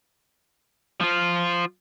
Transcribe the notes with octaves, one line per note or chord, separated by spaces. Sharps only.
F3 F4